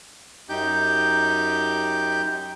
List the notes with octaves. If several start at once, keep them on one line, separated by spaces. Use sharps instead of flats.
F#2 D#4 G4 G6